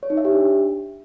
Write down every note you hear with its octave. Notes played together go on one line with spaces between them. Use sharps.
C#5
D#4
E5
G4
D4